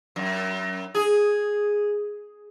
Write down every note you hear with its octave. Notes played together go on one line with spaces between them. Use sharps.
F#2
G#4